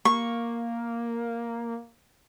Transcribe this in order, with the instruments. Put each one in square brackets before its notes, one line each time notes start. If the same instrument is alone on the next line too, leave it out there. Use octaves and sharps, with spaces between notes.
[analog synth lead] A#3 [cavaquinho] C#6